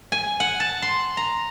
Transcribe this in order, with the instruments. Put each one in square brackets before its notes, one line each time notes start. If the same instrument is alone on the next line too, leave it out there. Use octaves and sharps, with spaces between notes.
[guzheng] G#5
F#5
A5
C6
A#5